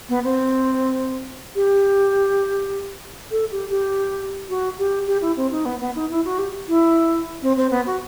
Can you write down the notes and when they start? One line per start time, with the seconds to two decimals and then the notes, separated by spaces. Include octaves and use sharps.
0.09 B3
0.24 C4
1.55 G4
3.31 A4
3.52 G4
3.70 G4
4.49 F#4
4.78 G4
5.07 G4
5.22 E4
5.37 C4
5.52 D#4
5.65 B3
5.80 B3
5.95 D#4
6.10 E4
6.25 F#4
6.38 G4
6.68 E4
7.42 C4
7.57 C4
7.71 B3
7.86 F#4